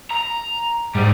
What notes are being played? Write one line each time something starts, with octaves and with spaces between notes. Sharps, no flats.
A#5
G#2 G3 D#4